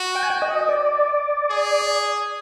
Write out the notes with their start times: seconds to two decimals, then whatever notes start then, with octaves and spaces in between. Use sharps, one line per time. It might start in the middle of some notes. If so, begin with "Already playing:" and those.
Already playing: F#4
0.15 G5
0.23 G#5
0.30 G5
0.42 D#5
0.69 D5
1.50 G#4